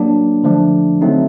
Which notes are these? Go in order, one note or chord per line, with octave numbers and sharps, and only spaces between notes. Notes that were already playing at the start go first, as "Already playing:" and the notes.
Already playing: F#3 A#3 D4
D3 F3 A3 D4
D3 F#3 A3 C4 D#4